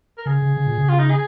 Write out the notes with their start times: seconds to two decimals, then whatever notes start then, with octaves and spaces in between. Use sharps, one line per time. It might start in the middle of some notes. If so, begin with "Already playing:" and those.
0.18 A#4
0.26 C#3 G#4
0.42 C#3
0.57 C#3
0.67 A#2
0.78 C#3
0.89 F4
0.99 D#4
1.10 G#4